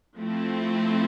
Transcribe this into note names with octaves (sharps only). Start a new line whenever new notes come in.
F3 A3 C4 E4